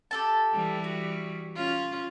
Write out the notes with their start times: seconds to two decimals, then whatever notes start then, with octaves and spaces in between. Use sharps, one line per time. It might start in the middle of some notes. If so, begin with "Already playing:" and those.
0.11 G4 A4 A5
0.53 E3 G3
0.84 F#4
1.56 C#4 F4